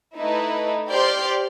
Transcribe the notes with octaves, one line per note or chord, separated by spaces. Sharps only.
A3 D#4 E4 B4
G4 C5 D5 C6 F6 G6